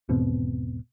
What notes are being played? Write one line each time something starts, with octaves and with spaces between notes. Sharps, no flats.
G#1 E2 B2 C4